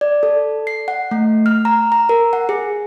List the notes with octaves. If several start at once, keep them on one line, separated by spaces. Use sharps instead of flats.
D5
A4
C7
F#5
A3
F6
A#5
A#5
A#4
F#5
G#4